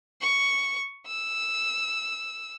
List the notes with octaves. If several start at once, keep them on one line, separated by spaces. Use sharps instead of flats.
C#6
E6